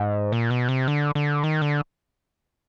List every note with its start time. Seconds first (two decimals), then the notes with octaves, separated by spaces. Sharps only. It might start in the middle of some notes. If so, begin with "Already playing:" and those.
Already playing: G#2
0.32 A#2
0.50 B2
0.69 C3
0.88 D3
1.15 D3
1.44 D#3
1.62 D3